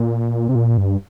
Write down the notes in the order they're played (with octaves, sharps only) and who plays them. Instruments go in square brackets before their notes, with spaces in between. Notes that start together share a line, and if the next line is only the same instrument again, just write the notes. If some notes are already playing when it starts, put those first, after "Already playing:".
Already playing: [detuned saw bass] A#2
C3
A#2
G2